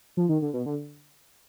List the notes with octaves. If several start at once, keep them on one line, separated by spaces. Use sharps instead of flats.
F3
D#3
D3
B2
D3